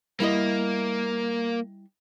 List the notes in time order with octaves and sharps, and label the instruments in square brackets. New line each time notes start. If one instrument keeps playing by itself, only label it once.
[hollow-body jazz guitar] G3 E4 D#5 [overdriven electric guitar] A#3